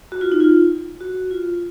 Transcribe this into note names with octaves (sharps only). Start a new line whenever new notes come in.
F#4
F4
D#4
F4
F#4
F4